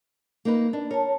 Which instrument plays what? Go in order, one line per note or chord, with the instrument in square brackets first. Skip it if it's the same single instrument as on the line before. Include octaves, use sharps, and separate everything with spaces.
[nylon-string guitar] A#3 D#4 B4
D4
[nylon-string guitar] A#4 [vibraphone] C#5 A5